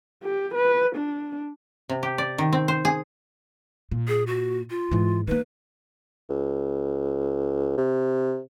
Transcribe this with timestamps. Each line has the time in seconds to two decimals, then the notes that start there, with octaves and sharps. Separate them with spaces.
0.23 G4
0.54 B4
0.96 D4
1.89 C3
2.03 G4
2.18 D5
2.38 D#3
2.53 C4
2.68 C5
2.85 G#4
3.91 A#2
4.08 G#4
4.27 F#4
4.70 F4
4.91 G#2 E3
5.27 D#3 A#3 B4
6.29 C#2
7.77 C3